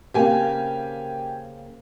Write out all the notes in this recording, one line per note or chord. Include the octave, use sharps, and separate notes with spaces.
C#3 A#3 C4 G4 G#5